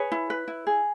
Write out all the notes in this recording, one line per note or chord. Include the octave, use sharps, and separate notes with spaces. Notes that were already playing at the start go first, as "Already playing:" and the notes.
Already playing: G#4 B4 C#5
E4
B4
E4
G#4